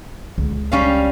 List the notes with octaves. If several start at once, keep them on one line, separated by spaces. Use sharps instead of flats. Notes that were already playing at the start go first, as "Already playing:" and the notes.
C#2
G3 C#4 F5